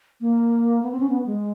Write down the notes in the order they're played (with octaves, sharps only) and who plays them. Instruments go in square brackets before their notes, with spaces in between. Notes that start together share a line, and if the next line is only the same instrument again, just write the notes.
[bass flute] A#3
B3
C4
C#4
B3
G#3